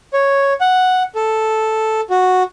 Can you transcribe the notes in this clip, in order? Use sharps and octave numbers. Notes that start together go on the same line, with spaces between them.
C#5
F#5
A4
F#4